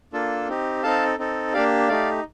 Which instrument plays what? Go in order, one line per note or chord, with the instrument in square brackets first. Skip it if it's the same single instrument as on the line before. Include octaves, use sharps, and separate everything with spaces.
[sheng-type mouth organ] A#3 D4 F4 A4
C4 D#4 G4
C4 D#4 A4 F5 A5
C4 D#4 A4
A#3 D4 G4 D5 F5
A3 D#4 G4 D5 F5